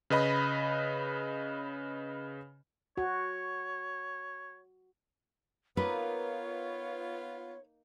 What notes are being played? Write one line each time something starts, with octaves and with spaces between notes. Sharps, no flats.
C#3 B4 D#5 B5
F#4 C#5
A#3 B3 D#4 F4 B4 C#5